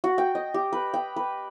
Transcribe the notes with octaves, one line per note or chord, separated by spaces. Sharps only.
F#4
G5
D#5
G4
B4
G5
B4